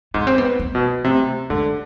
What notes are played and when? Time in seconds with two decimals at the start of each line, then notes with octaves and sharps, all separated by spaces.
0.14 G#2 B3
0.27 C4
0.38 B3
0.60 B3
0.75 B2
1.04 C3 A3
1.50 D3 G#3